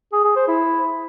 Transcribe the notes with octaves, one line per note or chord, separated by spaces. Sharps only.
G#4
G#4
C5
E4